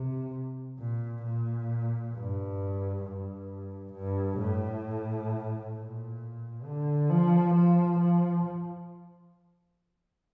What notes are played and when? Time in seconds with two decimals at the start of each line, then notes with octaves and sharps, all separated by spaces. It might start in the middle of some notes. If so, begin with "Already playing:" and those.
Already playing: C3
0.79 A#2
1.24 A#2
2.13 G2
3.04 G2
3.93 G2
4.38 A2
5.74 A#2
6.65 D3
7.10 F3
7.55 F3
8.00 F3